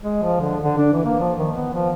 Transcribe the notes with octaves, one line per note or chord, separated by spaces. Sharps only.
G#3
F3
D3
D3
D4
E3
A#3
F3
D#3
B3
F3